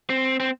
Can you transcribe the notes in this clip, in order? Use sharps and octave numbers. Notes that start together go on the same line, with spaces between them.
C4
C4